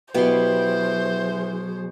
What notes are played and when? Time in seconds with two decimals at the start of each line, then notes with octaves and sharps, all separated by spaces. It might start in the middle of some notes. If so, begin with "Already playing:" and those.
0.14 B2 F#3 B3 E4 G4 G#4 C5 C6